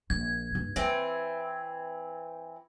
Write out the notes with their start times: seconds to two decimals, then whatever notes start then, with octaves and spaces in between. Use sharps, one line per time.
0.10 A#1 G#6
0.55 G2
0.76 E3 C4 E4